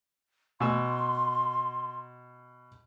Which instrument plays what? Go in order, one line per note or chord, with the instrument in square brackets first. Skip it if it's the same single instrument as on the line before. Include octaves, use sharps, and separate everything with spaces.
[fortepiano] B2 G#5 E6 [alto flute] C6